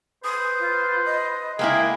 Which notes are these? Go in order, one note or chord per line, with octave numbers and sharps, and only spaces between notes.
B4 C5 D#6
F4
D#5
G#3 A#3 E4 G#4 A#4 G5